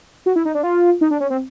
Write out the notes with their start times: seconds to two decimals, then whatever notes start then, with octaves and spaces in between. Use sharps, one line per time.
0.26 F#4
0.36 E4
0.45 D#4
0.55 D4
0.63 F4
1.01 D#4
1.11 D4
1.20 C#4
1.30 C4